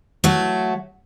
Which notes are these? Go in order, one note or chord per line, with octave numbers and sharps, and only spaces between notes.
F#3 A3 F#4